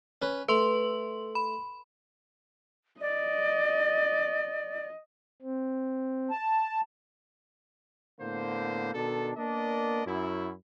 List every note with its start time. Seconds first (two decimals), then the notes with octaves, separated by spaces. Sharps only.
0.22 C#4 B4
0.49 A3 B4 C6 F#7
1.35 B5
3.01 D5 D#5
5.42 C4
6.31 A5
8.21 A2 D3 A#3 B3 C5
8.94 B2 D#3 D4 A4
9.37 A#3 B3 D4 A#4 D5 D#5
10.07 F#2 E4